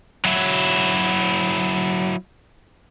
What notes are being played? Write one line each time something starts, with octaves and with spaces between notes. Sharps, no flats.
F#3 E4